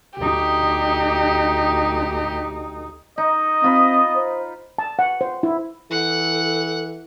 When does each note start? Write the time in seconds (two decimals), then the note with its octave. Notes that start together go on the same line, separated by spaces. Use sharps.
0.18 D2 D#4 G4
3.18 D#4 D#5
3.64 C4 F4 B5
4.16 C5
4.78 A5
4.99 F#5
5.21 C5
5.43 E4
5.91 E3 A4 F#5